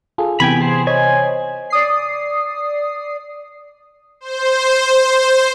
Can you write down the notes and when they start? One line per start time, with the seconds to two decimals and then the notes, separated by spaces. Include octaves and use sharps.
0.18 F4 G#4 A4
0.40 C3 E3 B3 G5 G#5 B5
0.61 G#4 C5
0.87 C5 C#5 D#5 G#5
1.70 D5 D#6 C7
4.21 C5